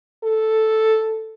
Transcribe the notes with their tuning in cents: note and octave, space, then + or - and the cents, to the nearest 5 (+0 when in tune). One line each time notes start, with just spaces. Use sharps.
A4 +0